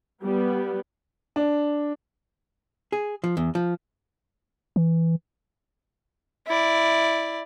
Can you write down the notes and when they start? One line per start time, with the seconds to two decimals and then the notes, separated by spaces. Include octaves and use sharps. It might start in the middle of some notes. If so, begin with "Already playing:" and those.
0.24 G3 B3
1.36 D4
2.92 G#4
3.24 F3
3.37 E2
3.55 F3
4.76 E3
6.47 E4 D5